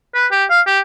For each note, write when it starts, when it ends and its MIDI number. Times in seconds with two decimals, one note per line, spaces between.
0.15 0.26 71
0.31 0.45 67
0.50 0.60 77
0.67 0.79 67